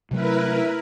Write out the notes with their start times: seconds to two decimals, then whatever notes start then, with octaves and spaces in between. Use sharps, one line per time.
0.11 C3 F#3 A3 E4 A#4 B4